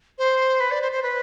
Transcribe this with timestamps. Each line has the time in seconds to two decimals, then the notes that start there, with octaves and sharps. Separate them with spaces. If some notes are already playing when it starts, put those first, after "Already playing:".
0.18 C5
0.60 B4
0.71 D5
0.82 C5
0.92 C5
1.02 B4